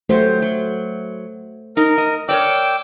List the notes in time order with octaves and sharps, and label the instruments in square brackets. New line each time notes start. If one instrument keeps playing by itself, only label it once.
[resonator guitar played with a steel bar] F#3 G4 [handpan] A3 C5
[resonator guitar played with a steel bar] F#3
[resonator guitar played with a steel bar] D#4 [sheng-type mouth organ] A#4
[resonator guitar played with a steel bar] D#5
[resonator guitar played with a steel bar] A#4 C#5 D5 [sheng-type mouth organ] G5 D6 E6